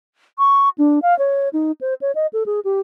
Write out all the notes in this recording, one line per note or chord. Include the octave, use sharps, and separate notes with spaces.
C#6
D4
F5
C#5
D#4
C5
C#5
D#5
A4
G#4
G4